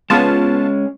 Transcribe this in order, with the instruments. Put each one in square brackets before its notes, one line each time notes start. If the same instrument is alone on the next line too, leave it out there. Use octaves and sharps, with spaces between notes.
[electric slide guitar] G#3 C#4 [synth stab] B3 F4 A5